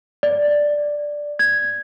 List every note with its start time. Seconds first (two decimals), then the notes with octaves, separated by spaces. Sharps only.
0.23 D5
1.39 G#6